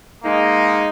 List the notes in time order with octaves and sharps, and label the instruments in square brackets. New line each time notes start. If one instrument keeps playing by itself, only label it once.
[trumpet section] G#3 D#4 [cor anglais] A#3